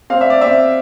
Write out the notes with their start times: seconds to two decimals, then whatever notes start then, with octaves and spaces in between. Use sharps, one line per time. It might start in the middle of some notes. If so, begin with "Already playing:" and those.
0.10 C4 F5
0.21 E5
0.30 D5
0.41 C4 E5